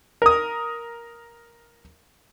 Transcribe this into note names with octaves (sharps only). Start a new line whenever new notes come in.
A#4 D#6